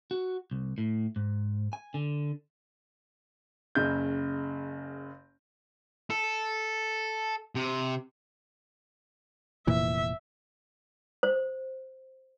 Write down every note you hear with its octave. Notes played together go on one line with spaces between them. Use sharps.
F#4
C2
A2
G#2
G#5
D3
F#1 C#3 G6
A4
C3
F1 A#2 E3 E5
C5